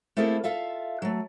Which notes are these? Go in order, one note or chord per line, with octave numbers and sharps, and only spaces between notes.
A3 A#3 C4 E4 G#4 A4
F4 A4 E5 F5
F#3 A3